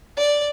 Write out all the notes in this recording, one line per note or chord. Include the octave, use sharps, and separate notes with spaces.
D5